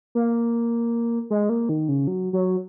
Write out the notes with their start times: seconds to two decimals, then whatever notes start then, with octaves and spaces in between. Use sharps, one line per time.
0.15 A#3
1.30 G#3
1.49 A#3
1.69 D#3
1.89 C#3
2.07 F#3
2.33 F#3